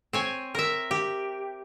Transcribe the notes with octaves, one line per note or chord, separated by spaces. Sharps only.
C4 C#5 G#5
A#4 E5
G4